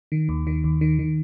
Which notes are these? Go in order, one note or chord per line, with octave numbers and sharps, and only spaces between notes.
D#3
D#2
D#3
D#2
D#3
D#3